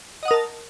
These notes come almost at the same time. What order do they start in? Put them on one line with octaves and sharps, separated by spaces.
D#5 F#5 D#6 A#4 A5